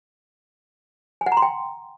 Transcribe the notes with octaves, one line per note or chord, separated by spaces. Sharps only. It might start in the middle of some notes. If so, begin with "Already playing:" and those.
G#5
F#5
A#5
C6
G5